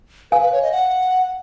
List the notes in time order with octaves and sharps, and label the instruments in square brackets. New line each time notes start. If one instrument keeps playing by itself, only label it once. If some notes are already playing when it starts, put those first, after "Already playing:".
[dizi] B4 [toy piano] F5 G#5
[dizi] B4
C#5
D#5
F#5